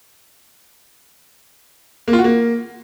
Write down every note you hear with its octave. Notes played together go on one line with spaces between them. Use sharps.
A#3
F4
F#4
A#3